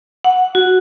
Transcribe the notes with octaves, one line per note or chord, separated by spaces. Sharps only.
F#5
F#4